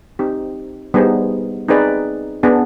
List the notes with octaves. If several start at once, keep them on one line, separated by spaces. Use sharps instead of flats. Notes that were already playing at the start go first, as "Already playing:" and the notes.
C4 D#4 G4
G3 B3 D#4 G#4 C5
C4 D#4 G#4 B4 D5
B3 D4 G#4